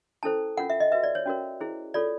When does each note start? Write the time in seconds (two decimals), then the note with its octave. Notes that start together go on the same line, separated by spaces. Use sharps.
0.23 C#4 E4 A4 C5 A5
0.57 C#4 F4 A#4 F#5
0.70 E5
0.80 D#5
0.92 F#4 B4 E5
1.03 D5
1.15 C#5
1.26 C#4 F#4 A#4 C#5
1.60 E4 G#4 C5
1.94 F4 A4 C#5 D5